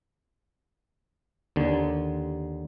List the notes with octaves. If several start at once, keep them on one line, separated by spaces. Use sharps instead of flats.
D#2 D3